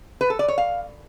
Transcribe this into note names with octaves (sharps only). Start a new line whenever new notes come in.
B4
A4
D5
C#5
F5